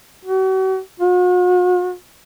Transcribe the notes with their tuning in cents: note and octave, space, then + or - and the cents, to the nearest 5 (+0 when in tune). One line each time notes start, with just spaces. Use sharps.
F#4 +40
F#4 -45